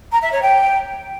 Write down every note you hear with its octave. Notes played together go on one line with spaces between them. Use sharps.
A#5
E5
C#5
G5